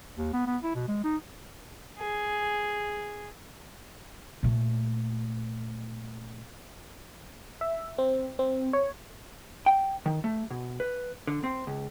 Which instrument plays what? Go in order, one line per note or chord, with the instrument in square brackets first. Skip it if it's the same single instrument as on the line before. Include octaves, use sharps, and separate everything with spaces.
[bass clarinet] D#2
B3
B3
E4
B2
G#3
D#4
[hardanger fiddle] G#4
[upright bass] A#2 A3
[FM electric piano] E5
C4
C4
C#5
[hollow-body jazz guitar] G5
D#3
A3
B2
B4
D3
C4
C#2